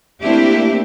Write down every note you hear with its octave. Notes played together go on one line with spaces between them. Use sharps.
A3 A#3 C4 D4 E4 G4